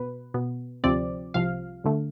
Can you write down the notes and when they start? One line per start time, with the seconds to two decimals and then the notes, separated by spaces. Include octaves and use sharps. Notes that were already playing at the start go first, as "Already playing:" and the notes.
Already playing: B2 B3 B4
0.34 B2 B3
0.84 D2 C3 F3 C4 D5
1.34 C2 C3 F3 F5
1.84 D2 D3 A3